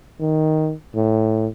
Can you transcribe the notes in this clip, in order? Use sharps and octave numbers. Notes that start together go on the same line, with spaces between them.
D#3
A2